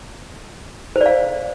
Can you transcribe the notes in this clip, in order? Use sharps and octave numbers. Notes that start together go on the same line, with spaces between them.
C5
D5
F5